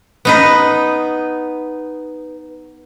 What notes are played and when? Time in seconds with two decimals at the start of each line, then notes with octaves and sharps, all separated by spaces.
0.25 B3 D#4 B4